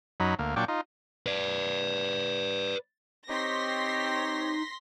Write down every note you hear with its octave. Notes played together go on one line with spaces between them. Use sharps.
F#2 F#3 D#4 B5
D2 A#3
A#2 F#3 D4 G5 C#6 D6
D#4 F4
B4 D5
C4 D#4 G4 C#5 C6 A#6 B6